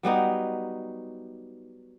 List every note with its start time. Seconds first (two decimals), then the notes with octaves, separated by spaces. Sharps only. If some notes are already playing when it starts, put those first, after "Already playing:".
0.03 F#3 G3 B3 D#4